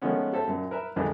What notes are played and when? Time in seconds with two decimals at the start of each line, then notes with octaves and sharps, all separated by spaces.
0.02 D#3 F3 G#3 A3 B3 C#4
0.33 G4 A4 C5 E5
0.47 F#2 A#2
0.71 A#4 B4 E5
0.96 A#1 F2 D3 E3 G#3